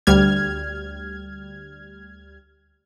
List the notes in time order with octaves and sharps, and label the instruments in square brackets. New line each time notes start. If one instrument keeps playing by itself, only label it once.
[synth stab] D2 G3 F6 G#6